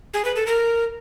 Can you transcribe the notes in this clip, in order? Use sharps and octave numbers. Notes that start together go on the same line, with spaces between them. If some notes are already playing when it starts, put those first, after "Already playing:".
G#4
B4
A4
A#4